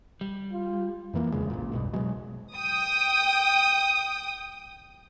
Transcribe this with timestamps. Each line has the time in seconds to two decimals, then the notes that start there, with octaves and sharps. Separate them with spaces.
0.21 G3
0.53 F4
1.13 F2 E3 A#3
1.32 D1 F2 C#3 G#3
1.50 A1 A#2
1.72 B1 E2 G2 B2
1.93 B2 F#3 G#3
2.54 G5 D#6